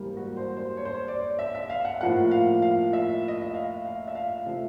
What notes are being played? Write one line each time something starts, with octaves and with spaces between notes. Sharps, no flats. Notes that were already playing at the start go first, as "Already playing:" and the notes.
Already playing: G#2 E3 G3 A#3
F#4
C5
C5
C#5
C5
C#5
D5
E5
E5
F5
F#5
A2 F3 A#3 F#5
F5
F5
E5
D#5
E5
F5
F5
E5
F5
C3 F3 A3 E5